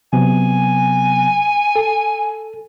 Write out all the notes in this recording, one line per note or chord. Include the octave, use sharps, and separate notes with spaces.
C3 F#3 B3 G#5
A4